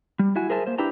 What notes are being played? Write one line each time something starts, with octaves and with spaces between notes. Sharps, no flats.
G3
E4 F#4 G#5
G#4 A#4 C5 E5 G#5 A5
A#3 C5
D4 E4 G4 B4 G5 A#5